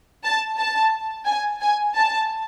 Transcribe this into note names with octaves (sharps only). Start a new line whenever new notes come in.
A5
A5
G#5
G#5
A5